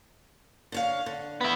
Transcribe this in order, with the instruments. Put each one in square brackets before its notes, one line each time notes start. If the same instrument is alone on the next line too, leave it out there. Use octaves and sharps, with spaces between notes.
[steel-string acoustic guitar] D3 C#5 F5
D3
[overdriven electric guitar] B3 E4